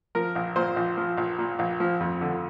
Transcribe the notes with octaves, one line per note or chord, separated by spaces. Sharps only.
F3 A#4
A#1
A#2 C5
A#1
F3
A#1
A#2
A#1
F3
F2
D3